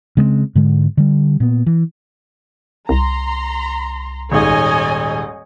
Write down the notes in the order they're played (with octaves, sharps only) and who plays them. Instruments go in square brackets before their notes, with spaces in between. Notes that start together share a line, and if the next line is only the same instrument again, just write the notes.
[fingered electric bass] C#3 G#3 A3 C4
G#2 D3 G#3
D3 G3
A#2 B3
E3
[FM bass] C2 [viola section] A#5 C6
[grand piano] D#1 G#2 [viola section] C#5 D#5 G#5